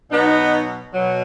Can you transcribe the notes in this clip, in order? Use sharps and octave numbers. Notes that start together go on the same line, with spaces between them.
B2 F#3 B3 D#4
B2 F#3